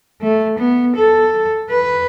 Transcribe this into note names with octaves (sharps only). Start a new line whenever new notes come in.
A3
B3
A4
B4